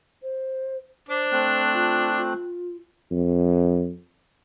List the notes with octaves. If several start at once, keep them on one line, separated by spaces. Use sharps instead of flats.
C5
D4 C5 D6
A3 C4 F#6
F4
F4
F2